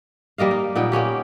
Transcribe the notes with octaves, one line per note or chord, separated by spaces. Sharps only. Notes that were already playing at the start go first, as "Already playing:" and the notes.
G3 A#3 D#5 F5
D#4
A#2 B3 D#4 G5
A#3 B3 C#4 G4